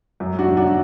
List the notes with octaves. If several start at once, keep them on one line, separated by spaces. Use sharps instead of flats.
F#2
D4 F#4
F#3
D4 F#4